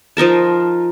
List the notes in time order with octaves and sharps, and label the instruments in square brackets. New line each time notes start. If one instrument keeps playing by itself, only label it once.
[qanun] F3 D#4 A#4 A5